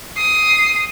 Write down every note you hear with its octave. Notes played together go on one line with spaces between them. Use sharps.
D#6 C7